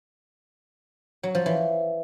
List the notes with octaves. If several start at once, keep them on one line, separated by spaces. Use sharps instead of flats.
F#3
F3
E3